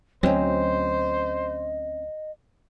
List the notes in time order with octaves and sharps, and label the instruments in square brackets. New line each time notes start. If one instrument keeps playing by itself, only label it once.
[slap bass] D2 F#3 [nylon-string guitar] C4 C#4 [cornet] C5 [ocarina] D#5